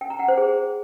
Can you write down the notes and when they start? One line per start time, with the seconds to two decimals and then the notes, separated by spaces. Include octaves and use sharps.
0.01 G5
0.10 A#5
0.19 F#5
0.28 C5
0.37 G#4